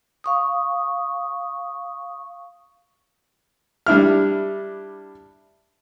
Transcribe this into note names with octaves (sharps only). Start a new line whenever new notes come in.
F5 C#6 D#6
G3 D4 E4 F6